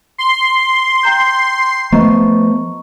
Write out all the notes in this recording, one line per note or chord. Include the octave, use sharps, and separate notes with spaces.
C6
G5 A#5 G6
F3 A3 B3 D#5 A#5 C#6